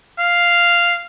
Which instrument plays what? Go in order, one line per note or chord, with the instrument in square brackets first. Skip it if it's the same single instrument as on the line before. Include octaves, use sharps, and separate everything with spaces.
[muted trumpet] F5